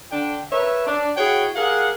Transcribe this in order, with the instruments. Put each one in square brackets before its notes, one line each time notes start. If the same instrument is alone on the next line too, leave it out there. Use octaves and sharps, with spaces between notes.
[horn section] D3 D4 G5
A#4 B4 C#5 E5
D4
E4 F#4 G#4 C#5 F#5 G5
G4 G#4 A#4 F5 F#5